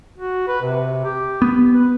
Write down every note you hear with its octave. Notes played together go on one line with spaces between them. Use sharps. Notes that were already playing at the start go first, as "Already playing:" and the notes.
F#4
B4
C3
G4
B3
B4